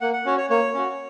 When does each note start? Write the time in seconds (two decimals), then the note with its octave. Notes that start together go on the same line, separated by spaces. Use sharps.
0.01 A#3 F#5
0.13 F#5
0.25 C#4 F#4 C#5
0.38 C#5
0.50 A#3 C#5
0.74 C#4 F#4